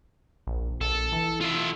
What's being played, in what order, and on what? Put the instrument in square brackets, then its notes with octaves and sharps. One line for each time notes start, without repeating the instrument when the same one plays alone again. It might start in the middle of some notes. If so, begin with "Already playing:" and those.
[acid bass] A#1
[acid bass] A#1 [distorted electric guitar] A4
[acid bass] E3
[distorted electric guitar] F4 E5